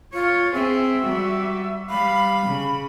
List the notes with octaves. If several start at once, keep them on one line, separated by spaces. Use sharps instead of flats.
F4 C#5
C4 G#4 E5
G3 F#4
G3 F5 B5
C#3